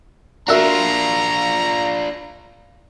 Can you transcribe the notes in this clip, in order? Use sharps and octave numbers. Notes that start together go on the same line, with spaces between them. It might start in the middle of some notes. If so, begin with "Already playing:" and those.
D4 F4 F#4 A#4 E5 A#5